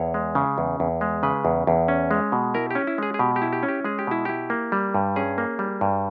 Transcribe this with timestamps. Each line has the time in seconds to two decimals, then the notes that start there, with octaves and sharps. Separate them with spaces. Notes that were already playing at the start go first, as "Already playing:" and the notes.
Already playing: E2 C#5
0.14 G#3
0.35 C#3
0.58 E2
0.80 E2
1.01 G#3
1.23 C#3 B4
1.45 E2
1.67 E2
1.88 C#4
2.11 G#3
2.32 B2
2.54 E4 A#4
2.71 C#4 G4
2.87 E4
2.98 G#3 G#4
3.14 G#4
3.19 B2 G4
3.36 G4
3.42 E4
3.53 G4
3.63 C#4
3.68 G4
3.84 G#3 G#4
3.99 G4
4.07 B2 E4
4.25 E4 G4
4.50 A#3
4.72 G3
4.95 G2
5.16 C#4 G#4
5.38 A#3
5.59 G3
5.81 G2